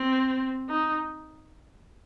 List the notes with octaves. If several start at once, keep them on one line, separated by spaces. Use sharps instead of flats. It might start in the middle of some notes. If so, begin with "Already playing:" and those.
Already playing: C4
D#4